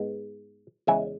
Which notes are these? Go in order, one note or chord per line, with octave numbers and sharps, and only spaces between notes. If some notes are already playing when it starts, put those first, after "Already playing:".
Already playing: G#2 G#3 B3
E2 C#3 G#3 E5 G#5